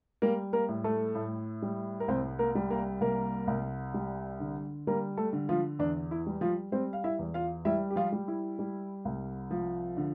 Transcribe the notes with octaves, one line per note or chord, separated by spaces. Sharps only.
G3 A#3 A#4
A#3 A#4
A2
A3 A4
A2
G3
A#4
C2 C4 C5
A#3 A#4
G3
A#3 A#4
C2 A#3 A#4
C2
G3
D3
G3 A#3 A#4
A3 A4
D3
F3 F4
E2 D4
E4
G3
F3 F4
G3 C4 C5
F5
E4 E5
E2
F4 F5
G3 E4 E5
G4
F3 F4
G3
E4
G3
C2
F3
D3